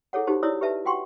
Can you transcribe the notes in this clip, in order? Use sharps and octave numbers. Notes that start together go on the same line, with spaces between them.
E4 G#4 A4 C#5 F#5
D#4 F#4 G4 C5 A5
E4 C#5 D5 D#6 E6
G4 B4 E5 A5
F#4 F#5 G5 C6 C#6